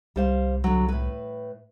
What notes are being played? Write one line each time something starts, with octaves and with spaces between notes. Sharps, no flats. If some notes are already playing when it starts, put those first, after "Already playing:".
C2 G3 C5 F5
D3 F#3
A2 B4